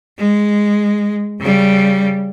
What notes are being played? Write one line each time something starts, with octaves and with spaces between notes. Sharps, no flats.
G#3
C#3 G3